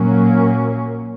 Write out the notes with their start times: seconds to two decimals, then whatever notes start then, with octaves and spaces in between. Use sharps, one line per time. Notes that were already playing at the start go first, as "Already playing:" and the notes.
Already playing: A#2 F#3 A#3 C#4